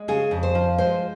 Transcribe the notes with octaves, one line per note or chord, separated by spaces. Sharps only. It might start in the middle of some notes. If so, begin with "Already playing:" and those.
Already playing: G#3
C#3 G#4
F2
C5
F3
G#3 C5